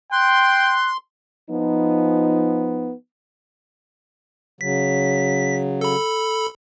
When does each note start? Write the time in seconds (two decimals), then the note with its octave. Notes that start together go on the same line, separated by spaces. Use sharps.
0.12 G5 C6 F#6
1.50 F3 B3 D#4
4.61 C#3 F#3 B6
5.81 A4 B5